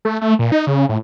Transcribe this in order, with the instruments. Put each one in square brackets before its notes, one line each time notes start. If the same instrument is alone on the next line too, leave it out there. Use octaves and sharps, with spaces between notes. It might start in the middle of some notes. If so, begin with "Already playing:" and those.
[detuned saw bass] A3
A3
A#2
D#4
C#3
A2